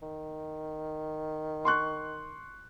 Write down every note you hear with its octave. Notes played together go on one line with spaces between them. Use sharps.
D#3
C6 C#6 F#6